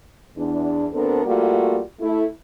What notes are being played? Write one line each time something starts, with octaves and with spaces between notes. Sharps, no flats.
E2 D4
D2 B3 C4 D4 A4 A#4
G3 A3 A#3 F4 F#4
A3 E4